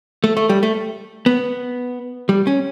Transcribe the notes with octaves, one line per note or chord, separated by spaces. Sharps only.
A3
A3
G3
A3
B3
G3
C#4